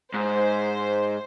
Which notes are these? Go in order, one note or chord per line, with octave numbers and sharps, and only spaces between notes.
G#2 C5